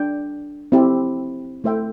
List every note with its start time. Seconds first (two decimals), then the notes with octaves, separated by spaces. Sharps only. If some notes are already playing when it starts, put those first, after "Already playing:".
Already playing: D4 G5
0.72 C4 E4 G4
1.64 A3 E4 C5 E5 G5